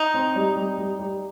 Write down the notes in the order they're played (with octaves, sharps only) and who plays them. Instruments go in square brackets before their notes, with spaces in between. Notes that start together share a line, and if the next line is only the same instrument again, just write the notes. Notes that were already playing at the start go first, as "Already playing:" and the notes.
Already playing: [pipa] D#4
[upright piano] C4
G3
G3
G3
G3